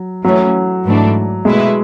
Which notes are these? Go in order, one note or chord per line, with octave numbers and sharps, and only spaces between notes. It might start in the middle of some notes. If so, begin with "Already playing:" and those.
Already playing: F#3
E3 F#3 A3 C#4
G#2 E3 A3 D4
B2 G#3 A3 E4 B4